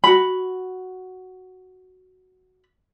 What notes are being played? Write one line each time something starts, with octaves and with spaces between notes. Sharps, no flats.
F#4 B5